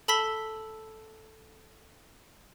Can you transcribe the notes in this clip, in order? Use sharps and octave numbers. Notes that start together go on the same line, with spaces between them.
A4 A5 B5 E6 B6 G7